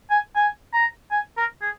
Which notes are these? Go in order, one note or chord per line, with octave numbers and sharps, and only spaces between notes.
G#5
G#5
A#5
G#5
A#4
G#4